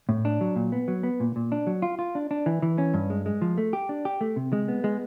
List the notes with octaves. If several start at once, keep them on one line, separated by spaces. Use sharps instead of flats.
A2
D4
F#3
A#2
B3
F#3
B3
A#2
A#2
D4
F#3
F4
F4
D4
D4
E3
E3
C#4
G2
G#3
G#3
F3
A3
G4
D4
G4
A3
C3
G#3
B3
G#3